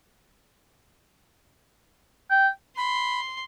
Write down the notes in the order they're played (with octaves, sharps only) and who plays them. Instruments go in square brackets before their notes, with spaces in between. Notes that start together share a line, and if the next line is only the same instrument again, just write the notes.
[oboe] G5
[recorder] B5 [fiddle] C6